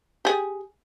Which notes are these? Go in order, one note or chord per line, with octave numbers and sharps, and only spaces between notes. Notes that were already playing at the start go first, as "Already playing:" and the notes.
G4 G#4